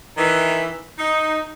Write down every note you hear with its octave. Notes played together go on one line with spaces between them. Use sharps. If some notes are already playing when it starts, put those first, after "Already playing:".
D#3 E3
D#4